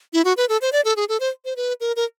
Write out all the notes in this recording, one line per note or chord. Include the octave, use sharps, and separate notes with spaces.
E4
F#4
B4
A4
C5
D5
A4
G#4
A4
C5
C5
B4
A#4
A#4